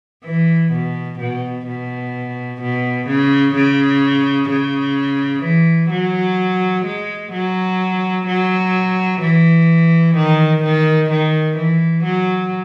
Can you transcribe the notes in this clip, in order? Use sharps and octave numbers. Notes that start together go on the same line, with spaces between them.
E3
B2
B2
B2
B2
C#3
C#3
C#3
E3
F#3
G#3
F#3
F#3
E3
D#3
D#3
D#3
E3
F#3